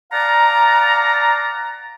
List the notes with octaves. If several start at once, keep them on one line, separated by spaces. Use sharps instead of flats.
D5 F5 F#5 A5 A#5